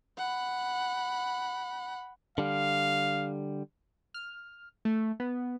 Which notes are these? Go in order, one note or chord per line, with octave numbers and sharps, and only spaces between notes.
F#5 B5
D3 G3 F5
F6
A3
B3